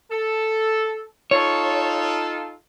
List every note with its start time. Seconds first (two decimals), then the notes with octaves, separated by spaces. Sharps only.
0.11 A4
1.31 D#4 F4 A4 C#5